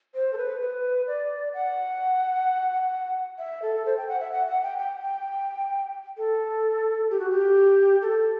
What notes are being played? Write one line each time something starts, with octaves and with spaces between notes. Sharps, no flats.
C5
A4
B4
B4
D5
F#5
E5
A4
C5
G5
F#5
E5
F#5
F#5
G5
G5
G5
A4
G4
F#4
G4
A4